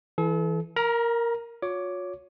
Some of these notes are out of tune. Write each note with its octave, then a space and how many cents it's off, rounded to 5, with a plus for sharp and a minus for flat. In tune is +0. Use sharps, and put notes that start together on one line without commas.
E3 +0 A4 -40
A#4 +0 A#5 +35
F4 +45 C#5 +15 D6 +0